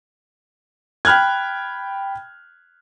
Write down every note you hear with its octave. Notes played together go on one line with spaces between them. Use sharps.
G5 B5 F6 F#6 G#6